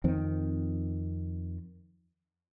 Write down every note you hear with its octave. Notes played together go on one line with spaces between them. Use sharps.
F2 D#3 C4